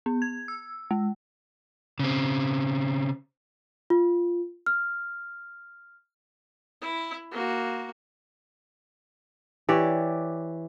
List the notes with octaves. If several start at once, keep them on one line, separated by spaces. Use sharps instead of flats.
B3
G#6
E6
G#3
C#3 C4
F4
F6
E4
A#3 F#4
E3 G4 C#5 D5